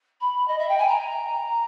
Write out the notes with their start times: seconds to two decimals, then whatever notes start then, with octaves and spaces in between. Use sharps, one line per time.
0.20 B5
0.47 D#5
0.58 E5
0.68 G5
0.78 G#5
0.87 A#5